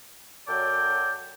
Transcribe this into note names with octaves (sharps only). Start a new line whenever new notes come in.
F#2 F#3 A4 D5 G5